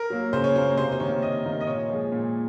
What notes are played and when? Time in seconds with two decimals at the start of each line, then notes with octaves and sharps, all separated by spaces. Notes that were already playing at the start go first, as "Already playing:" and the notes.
Already playing: A#4
0.10 F#3 A#3
0.33 C#3 C5
0.44 C#5
0.55 F#3 A#3 C5
0.77 C3 C5
0.92 C5
1.00 D#3 A#3 C#5
1.22 C3 D#5
1.45 D#3 A#3
1.60 D#5
1.67 A#2 C#5
1.90 F3 G#3
2.12 A#2